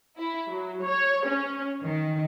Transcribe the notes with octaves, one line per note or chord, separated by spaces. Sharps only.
E4
F#3
C#5
C#4
D#3